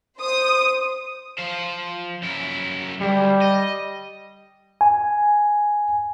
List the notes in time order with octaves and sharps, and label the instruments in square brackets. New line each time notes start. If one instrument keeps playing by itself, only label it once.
[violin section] C5 D#6
[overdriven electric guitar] F3 C5
F#2 E4
[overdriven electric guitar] D2 [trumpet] G3
[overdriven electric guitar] D#5
[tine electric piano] G#5